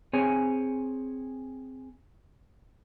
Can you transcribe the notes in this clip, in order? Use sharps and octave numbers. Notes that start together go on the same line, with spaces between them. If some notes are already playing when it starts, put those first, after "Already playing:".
C4 G#4 C#5 G#5